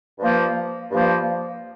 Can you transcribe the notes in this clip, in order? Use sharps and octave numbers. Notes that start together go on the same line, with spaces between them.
G2 F3 A#3
G2 F3 A#3